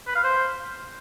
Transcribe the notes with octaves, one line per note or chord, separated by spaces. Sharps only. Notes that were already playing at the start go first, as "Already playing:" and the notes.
B4
F5
C5